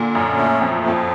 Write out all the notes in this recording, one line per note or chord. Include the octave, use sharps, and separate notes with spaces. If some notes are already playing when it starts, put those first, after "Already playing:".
Already playing: A#2 D3
F#2 C#4
A3
F2 F3
F2 F3